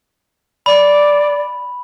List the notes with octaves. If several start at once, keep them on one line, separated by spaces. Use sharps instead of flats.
D5 B5